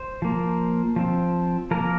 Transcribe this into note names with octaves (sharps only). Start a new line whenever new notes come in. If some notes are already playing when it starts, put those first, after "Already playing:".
Already playing: C5
F3 A#3
F3 C4
F3 A#3 A#4